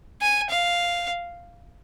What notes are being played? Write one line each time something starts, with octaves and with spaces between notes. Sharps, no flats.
G#5
F5